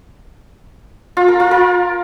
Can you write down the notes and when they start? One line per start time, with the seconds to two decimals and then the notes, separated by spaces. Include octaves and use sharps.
1.17 F4
1.28 A#4
1.40 F4
1.51 A#4